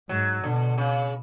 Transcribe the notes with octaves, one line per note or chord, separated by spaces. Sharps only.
G#2 F#3
B2 D3
C#3